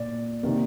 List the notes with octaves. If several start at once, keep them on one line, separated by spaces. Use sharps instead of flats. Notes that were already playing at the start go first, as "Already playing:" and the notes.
Already playing: A#2 D5
C3 D#3 A#3